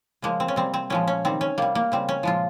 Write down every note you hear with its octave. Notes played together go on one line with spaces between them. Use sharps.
C#3 F3 G#3 A#3
C4
C#4
C3 G3 C4
C4
A#2 F3 G#3 C#4
C#4
C3 D#3 G3 C4
C#4
C3 G3 A#3
A#3
C#3 G3 C4
C#4
A#2 F3 G#3 F4